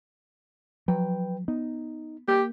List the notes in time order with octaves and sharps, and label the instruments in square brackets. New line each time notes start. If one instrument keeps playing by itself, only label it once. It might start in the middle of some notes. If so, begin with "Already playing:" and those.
[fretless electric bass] F3 F#3 [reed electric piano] B4 G5
[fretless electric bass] B3 [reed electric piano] D#4
[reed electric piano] A#3 [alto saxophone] G4